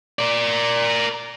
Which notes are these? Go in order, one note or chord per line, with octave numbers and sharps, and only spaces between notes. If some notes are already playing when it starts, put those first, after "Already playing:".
A#4 D5